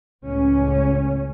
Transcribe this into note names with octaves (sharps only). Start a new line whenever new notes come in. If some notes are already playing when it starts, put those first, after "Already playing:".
C#2 A2 C#4